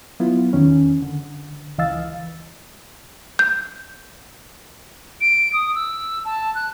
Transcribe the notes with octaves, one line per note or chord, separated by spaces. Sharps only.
F#3 B3 E4 F4
E2 D#3 C#4
D3
C#2 E3 D#5 F5 E6 A6
G6
D7
D#6
E6
A5
F#6